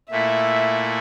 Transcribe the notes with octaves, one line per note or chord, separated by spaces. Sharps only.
A#2 A3 E4 E5